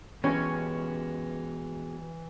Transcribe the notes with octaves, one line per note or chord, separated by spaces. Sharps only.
B2 E3 G#3 C#4 G4